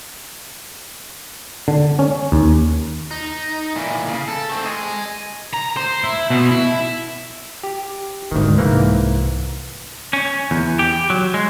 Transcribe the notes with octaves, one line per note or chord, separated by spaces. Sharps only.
D3
C#4
D#2
D#4
A#2 E3
C#3
A4
A3 C4
G#4 D#5
A#5
C5
E4
B2
E4
G4
D2 G#2 B2 D#3
C2 G#2 E3 A#3
C#4
E2
G4
F#3
G#3